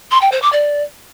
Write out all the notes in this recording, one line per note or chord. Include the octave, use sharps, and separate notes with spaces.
C6
G5
C5
D6
D5